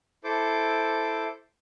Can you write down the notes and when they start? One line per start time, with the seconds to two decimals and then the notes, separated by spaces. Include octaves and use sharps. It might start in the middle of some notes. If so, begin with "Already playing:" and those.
0.24 E4 A4 C5 D6